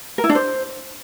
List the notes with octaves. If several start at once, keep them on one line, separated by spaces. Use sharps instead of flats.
A#4
E4
D4
C5